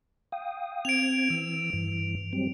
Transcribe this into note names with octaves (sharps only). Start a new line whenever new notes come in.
F5 G5 D#6
C4 G#6 D7 F7
E3 E6
G2 E3
F#3 G3 C4